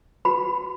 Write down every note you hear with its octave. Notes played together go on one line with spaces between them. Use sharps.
F#4 B4 B5